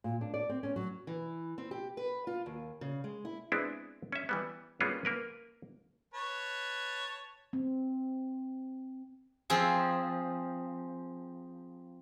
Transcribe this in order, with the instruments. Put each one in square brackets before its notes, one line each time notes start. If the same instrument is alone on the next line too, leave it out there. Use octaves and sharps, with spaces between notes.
[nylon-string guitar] A#2
D4
D5
C4
C#4
F#3
[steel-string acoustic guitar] E3
C4
G4
B4
F4
D#2
C#3
G#3
E4
[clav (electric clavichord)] G#3 B3 C4 D4 E4
C#4 E5
E3 G3 B3
G3 G#3 A#3 B3 C#4 F4
A#3 A#4 B4
[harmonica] B4 C#5 A5
[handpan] C4
[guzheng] F3 C4 G#4